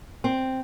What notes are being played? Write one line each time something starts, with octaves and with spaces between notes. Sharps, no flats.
C4